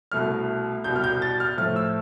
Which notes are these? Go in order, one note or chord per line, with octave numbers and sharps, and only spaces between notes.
C2 B2 A3 F6
C2 B2 G3 G6
F6
G6
A6
F6
A2 F3 A3 F6
E6